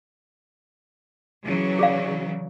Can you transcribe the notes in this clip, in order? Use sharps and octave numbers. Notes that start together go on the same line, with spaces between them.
C#3 E3 F#3
G#4 D5 F5